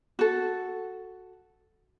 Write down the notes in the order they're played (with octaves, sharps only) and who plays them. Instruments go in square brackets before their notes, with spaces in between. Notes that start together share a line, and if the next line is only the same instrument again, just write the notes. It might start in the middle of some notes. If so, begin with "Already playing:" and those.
[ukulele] F#4 A4